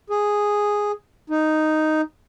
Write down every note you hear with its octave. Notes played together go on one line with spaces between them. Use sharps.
G#4
D#4